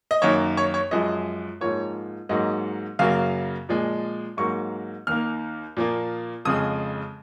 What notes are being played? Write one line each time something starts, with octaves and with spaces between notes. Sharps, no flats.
D#5
F#2 D#3 A#3 C#5
C#5
C#5
F#2 F3 G#3 D#5
G#2 F3 A#3 C#5
G#2 F#3 A#3 D#5
F#2 C#3 F#3 A#3 F5
A#2 F3 G#3
G#2 F#3 A#3 C#6
D#2 D#3 A#3 F6
A#2 F3 A#3
F2 C#3 G#3 D#6